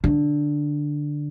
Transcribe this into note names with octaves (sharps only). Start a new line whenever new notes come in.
D3